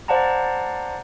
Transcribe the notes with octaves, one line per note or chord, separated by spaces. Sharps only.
C5 D5 F5 F#5 A5 A#5